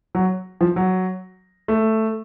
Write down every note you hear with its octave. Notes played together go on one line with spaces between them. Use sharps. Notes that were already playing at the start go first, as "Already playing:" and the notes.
F#3
F3
F#3
A3